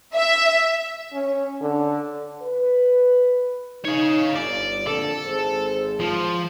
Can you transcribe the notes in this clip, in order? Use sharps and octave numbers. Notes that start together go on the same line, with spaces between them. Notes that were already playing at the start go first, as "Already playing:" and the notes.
E5
C#4
D3
B4
D#4 C#5 F5
G1 D5
F2 A#2 D3 A4
G#1 G#4 C5
F3